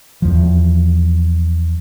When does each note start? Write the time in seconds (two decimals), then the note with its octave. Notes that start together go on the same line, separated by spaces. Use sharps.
0.22 E2 F3